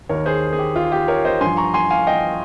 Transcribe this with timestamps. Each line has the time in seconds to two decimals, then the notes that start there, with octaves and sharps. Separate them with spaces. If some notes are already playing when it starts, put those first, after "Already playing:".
0.09 D#2 D#3 A#4 C#5
0.26 G#4 C5
0.53 G#4
0.58 G4
0.76 F4
0.92 G4
1.08 A#4 C#5
1.24 C5 D#5
1.41 G2 F3 G#5 C6
1.57 A#5 C#6
1.74 G#5 C6
1.90 F5 G#5
2.07 D#5 G5